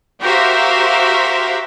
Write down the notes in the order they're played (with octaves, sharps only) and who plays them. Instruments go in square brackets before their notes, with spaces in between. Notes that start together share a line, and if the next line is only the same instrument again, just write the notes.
[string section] F#4 G4 A#4 C5 E5 F5